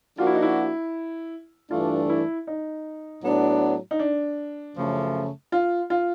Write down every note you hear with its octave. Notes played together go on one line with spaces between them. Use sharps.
F3 A#3 D4 F4 F#4
E4
D#4
E4
G2 E3 A3 D4 F4
E4
D#4
A2 F#3 B3 D4
D#4
D4
F#2 C#3 F3 A3
F4
F4